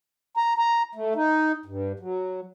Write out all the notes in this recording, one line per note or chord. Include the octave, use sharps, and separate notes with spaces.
A#5
A#5
A3
D#4
G2
F#3